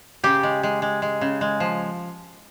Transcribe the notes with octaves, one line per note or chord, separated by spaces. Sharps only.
C#3 G4
G#3
G#3
G#3
G#3
C#3
G#3
F3